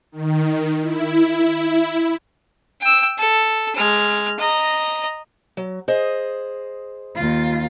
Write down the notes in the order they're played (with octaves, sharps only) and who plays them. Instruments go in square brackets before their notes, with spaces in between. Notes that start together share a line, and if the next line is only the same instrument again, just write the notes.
[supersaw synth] D#3
E4
[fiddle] G5 E6
A4
G#3 F6
D#5 A#5
[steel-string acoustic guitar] F#3
G#4 C5 D#5
[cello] D#2 F4